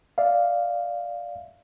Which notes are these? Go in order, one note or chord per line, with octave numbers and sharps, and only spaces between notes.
D5 E5 F5